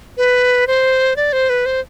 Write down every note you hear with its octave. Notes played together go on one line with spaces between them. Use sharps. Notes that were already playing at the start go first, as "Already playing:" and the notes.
B4
C5
D5
C5
B4
C5